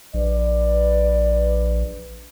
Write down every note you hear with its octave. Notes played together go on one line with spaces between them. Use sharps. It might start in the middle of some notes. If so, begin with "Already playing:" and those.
A#1 B4 D5